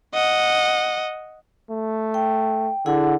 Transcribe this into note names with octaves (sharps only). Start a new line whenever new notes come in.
D#5 F#5
A3
G5
D3 E4 G#4 F#5